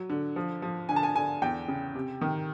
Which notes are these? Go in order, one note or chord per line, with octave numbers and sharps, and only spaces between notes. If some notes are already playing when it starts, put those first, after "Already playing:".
Already playing: F#3
D3
F3
F3
D3 G#5
A5
G#5
D3 G#5
E2 G5
C#3
C3
D#3